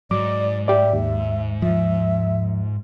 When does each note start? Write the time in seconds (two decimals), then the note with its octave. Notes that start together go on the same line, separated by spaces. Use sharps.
0.11 G#2 F#3 D5 D6
0.68 G4 D5 E5
0.93 D#2
1.62 F3 E5